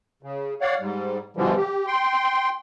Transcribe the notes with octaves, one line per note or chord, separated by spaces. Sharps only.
C#3
C#5 D5 F5 F#5
G#2 G3
G2 B2 D3 E3 F3 G3
G4
G5 C6